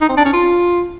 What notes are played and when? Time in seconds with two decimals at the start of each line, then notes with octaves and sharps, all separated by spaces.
0.01 D#4
0.09 C4
0.17 D4
0.25 C#4
0.33 F4